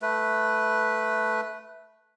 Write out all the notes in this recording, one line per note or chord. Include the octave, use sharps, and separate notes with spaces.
A3 B4